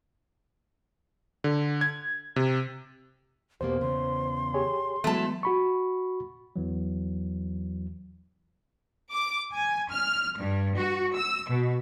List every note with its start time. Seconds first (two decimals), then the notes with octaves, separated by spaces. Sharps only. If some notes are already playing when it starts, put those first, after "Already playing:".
1.44 D3
1.81 G#6
2.36 C3
3.61 E2 B2 A#3 G4 C5
3.81 E2 C#3 C6
4.54 G4 G#4 C#5
5.04 E3 F#3 G#3 A3 B3 A5
5.43 F#4 B5 C#6
6.56 E2 E3 F#3
9.12 D6
9.52 G#5
9.91 F6
10.38 G2
10.77 F#4
11.16 E6
11.49 B2